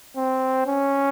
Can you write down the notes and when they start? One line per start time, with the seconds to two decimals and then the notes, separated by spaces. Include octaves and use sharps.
0.17 C4
0.67 C#4